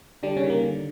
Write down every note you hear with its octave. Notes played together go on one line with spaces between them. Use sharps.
D3 G3 D4
C#3 C#4
D#3
A#3
D3